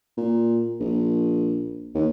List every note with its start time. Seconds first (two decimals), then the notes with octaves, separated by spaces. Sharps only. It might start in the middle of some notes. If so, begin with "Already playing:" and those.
0.17 A#2
0.80 A#1
1.95 D#2